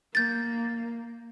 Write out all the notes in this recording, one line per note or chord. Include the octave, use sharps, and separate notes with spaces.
A#3 G6 A6